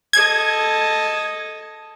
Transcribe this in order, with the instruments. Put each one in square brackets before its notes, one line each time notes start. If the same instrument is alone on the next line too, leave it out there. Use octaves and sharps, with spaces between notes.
[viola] A4 D#5 [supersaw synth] G#6